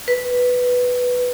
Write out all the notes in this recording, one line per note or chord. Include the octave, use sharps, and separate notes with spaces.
B4